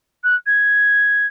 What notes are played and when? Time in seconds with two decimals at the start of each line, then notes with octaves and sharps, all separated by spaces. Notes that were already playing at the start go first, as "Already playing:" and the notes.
0.23 F#6
0.46 G#6